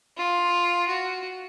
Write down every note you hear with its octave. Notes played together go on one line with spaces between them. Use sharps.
F4
F#4